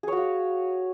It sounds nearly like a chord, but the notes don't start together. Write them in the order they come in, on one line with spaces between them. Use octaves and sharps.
G#4 C#5 F#4 F5